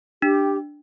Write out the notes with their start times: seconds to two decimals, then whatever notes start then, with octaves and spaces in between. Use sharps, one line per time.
0.22 D4 G4